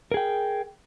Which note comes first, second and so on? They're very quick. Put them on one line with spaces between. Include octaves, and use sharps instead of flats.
A#4 G#4 G5